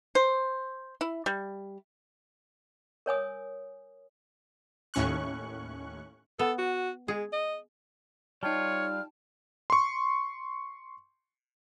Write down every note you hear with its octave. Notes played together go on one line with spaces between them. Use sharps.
C5
E4
G3
A#4 C#5 G#5 D#6
D#2 A2 C#4 C#6 F#6
B3 A4
F#4
G#3 G#4
D#5
G3 D#4 F4 C#5 G5 A5 F6
C6 C#6